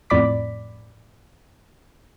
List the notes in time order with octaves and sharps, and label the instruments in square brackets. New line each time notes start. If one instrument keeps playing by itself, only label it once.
[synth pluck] F2 A2 D5 B5 D6 B6